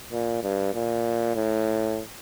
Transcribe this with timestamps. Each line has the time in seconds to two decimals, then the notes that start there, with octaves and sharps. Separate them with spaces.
0.13 A#2
0.43 G2
0.74 A#2
1.36 A2